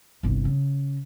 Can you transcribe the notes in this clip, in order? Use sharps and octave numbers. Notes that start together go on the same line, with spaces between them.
G1 C2
C#3